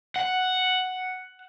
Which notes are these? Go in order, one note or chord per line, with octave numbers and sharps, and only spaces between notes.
F#5